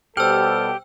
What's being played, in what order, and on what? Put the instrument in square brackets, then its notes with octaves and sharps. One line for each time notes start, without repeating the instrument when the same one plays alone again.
[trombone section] B2 G3 A4 [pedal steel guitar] G4 [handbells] C5 F6 [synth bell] G5 E6